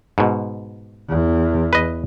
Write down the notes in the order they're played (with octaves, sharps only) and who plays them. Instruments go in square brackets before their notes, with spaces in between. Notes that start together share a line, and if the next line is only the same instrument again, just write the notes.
[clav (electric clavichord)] G#2 B2
[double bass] E2
[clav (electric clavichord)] B4 D#5